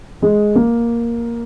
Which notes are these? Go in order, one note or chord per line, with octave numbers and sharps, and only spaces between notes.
G#3
A#3